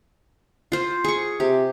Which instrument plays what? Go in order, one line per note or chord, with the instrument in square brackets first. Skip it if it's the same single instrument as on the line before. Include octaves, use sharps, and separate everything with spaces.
[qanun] F4 C5
G#4 C#6
[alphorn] C3 [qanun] G4